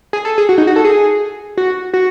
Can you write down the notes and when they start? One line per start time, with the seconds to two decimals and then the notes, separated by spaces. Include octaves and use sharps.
0.13 G#4
0.25 A4
0.38 G#4
0.49 F#4
0.58 D#4
0.67 F#4
0.76 A4
0.85 G#4
1.57 F#4
1.94 F#4